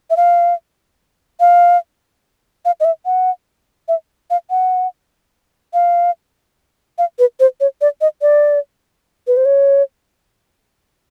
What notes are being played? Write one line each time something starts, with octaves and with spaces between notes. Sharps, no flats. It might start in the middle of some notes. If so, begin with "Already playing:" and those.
E5
F5
F5
F5
D#5
E5
F#5
E5
F5
F#5
F5
F5
B4
C5
C#5
D5
D#5
D5
B4
C5
C#5